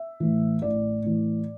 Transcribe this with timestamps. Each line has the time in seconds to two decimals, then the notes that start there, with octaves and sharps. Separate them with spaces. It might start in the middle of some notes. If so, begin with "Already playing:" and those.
Already playing: E5
0.20 A2 E3
0.62 A1 D5
1.04 A2 E3